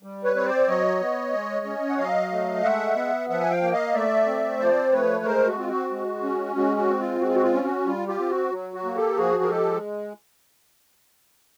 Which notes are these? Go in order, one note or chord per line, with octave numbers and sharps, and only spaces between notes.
G3
B4 C#5
C4 C#5
C5 D5
F#3 C#5 D#5
B3
G#3
C#4
F#5
F#3 D#5 F5
A3
G#3 E5 F#5
B3
F3 E5 F#5
G#5
F5 G5
A#3
D#5 F5
A3 D5 E5
C4
F3 C5 D5
A3 B4 C#5
G#3 A#4 C5
F#4
C4 F4
F#4
G#3
C#4
G#3 F#4
F#4
C4
F4
G#3 F#4
F4
F#4
F4
C#4
F#4
G3 F4
F4 G4
C4
F#4
F#3
F#4
A#3
G4 A4
F3 F#4 G#4
A#4
G#3 G4 A4